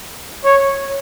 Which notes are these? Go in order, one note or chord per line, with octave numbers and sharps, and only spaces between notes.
C#5